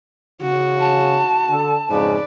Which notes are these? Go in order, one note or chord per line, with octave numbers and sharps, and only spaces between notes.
C#3 F#4
A5
D3 A4
F2 G#2 C#3 B4 D5